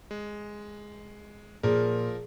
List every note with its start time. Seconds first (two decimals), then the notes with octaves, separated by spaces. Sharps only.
0.11 G#3
1.63 A#2 F3 G#4 A#4